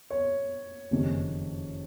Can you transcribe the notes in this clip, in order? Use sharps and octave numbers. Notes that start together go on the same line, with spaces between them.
C#5
F#1 F2 C3 D#3